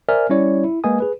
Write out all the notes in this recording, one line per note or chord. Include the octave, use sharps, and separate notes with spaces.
A#4 C5 D5 E5 G#5 F6
G3 C#4 E4 C#5 D5
E4
G#3 A#3 B4 D#5 G#5 D#6
G#4 B4